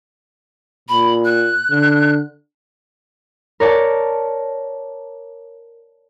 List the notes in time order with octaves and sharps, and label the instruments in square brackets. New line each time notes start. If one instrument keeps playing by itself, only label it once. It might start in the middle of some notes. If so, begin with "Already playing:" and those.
[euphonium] A#2 [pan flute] B5
[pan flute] F#6
[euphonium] D3
[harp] A#4 C#5 D5 A5